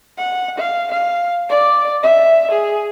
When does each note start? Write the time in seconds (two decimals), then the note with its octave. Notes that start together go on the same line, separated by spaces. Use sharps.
0.18 F#5
0.58 F5
0.92 F5
1.50 D5
2.03 E5
2.52 G#4